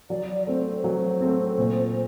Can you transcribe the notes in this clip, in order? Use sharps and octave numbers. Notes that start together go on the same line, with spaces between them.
F#3 D5
A3 C4 C5
F#3 C5
A3 C4
A#2